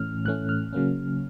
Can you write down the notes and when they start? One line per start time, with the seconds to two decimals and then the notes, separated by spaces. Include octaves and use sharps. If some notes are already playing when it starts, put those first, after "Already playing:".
Already playing: A2 E3 A3 C#4 F6
0.25 A2 E3 A3 C#4 F#6
0.49 F6
0.73 C#3 F#3 A#3 C#4